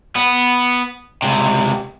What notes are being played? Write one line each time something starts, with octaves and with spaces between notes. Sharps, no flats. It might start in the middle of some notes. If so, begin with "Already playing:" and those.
B3
C#2 C3